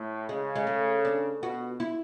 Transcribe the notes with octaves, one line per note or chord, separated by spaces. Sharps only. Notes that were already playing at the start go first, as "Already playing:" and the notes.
Already playing: A2
C#3 G#3
G#3
A3
D4
B2 F#4
E4